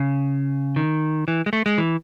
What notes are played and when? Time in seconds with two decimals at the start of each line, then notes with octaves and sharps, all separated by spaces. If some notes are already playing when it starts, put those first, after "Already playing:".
Already playing: C#3
0.76 D#3
1.28 E3
1.46 G#3
1.53 A3
1.66 G#3
1.78 E3